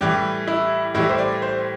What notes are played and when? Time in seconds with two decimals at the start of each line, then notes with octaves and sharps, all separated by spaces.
0.01 A2 E3 G3 G4
0.47 E4
0.94 A2 E3 G3 E4
1.09 C5
1.18 D5
1.42 C5